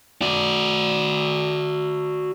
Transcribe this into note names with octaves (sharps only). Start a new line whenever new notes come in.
F#4 D5